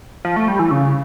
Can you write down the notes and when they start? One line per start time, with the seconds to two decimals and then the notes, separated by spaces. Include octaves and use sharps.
0.25 F3
0.36 A3
0.48 G3
0.59 E3
0.71 C#3